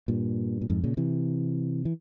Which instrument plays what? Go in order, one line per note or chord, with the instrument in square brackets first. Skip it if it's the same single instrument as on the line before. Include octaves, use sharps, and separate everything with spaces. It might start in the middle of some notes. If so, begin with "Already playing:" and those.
[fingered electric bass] G2 A#2
A#2
F2 G#2
A#2 C#3
C3 E3
E3